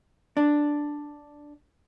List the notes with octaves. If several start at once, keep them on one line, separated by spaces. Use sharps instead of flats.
D4